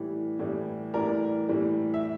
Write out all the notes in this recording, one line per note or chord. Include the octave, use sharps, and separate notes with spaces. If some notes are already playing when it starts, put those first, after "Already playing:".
Already playing: A2 E3 G3
A2 E3 G3
A2 E3 G3 A#4 D5
A2 E3 G3
E5